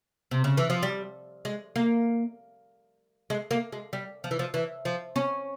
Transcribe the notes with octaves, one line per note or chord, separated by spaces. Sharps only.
C3
C#3
E3
F3
G3
G#3
A#3
G#3
A#3
G#3
G3
F3
E3
F3
E3
F3
C#4